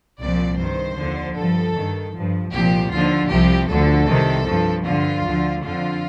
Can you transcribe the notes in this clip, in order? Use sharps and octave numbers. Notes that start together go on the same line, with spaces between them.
C2 A#2 F3 D5
G2 D#3 C5
D#2 D3 F3
G2 F3 A4
G2 D#3
G2 F3
C2 A#2 F3 G4
D#2 D3 F3 F4
C2 C3 F3 G4
D2 D3 F3 A4
C2 C3 D#3
G2 F3
G2 D3 F3 F4
D2 D3 F3
F2 D3 F3 F4